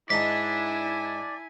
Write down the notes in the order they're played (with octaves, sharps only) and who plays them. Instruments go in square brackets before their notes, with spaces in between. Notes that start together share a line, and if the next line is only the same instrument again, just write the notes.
[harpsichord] G#2 D#4 [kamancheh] E4 G#5 [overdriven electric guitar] D5 A5 [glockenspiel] B6